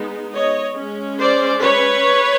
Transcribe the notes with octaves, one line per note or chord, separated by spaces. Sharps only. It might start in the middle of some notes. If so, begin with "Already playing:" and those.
Already playing: G#3 B3 D#4
C#5 D#5
G#3 C#4
C5 D5
B4 C#5